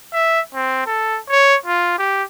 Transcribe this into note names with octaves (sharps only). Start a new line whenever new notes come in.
E5
C4
A4
C#5
F4
G4